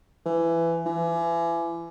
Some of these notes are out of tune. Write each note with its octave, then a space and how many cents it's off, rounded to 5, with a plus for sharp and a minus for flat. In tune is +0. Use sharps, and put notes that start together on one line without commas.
E3 +15
E3 +35